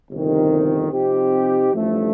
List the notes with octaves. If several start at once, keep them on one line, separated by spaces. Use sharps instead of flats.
G1 F2 C3 D#3
C3 F3 C4 D#4 G4
A1 G2 F3 A3